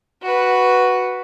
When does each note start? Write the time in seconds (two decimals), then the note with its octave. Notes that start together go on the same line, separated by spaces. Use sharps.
0.22 F#4 B4